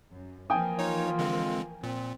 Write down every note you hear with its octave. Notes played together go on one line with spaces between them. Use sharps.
F#2
E3 F3 A#3 G5 G#5 D#6
D#4 F4 C#5
D3 G#3 C4
A#2 C4